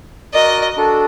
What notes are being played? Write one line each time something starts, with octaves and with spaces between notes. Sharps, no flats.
F#4 A#4 D5 D#5
D4 F#4 A4